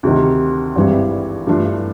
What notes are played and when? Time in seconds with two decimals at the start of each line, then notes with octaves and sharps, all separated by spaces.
0.03 D2 C3 D#3
0.76 G#1 G2 E3 G3
1.47 G2 E3 A3 D4 F4